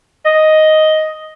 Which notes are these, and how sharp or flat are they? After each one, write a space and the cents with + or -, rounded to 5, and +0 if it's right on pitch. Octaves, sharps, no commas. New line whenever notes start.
D#5 +5